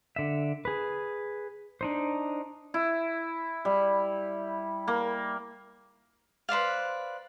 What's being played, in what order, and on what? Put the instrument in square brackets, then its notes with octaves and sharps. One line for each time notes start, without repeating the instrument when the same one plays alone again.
[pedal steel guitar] D3 E5
G#4 B4
D4 D#4 C5
[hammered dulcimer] E4
G3
A#3
[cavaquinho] B4 C5 D5 F5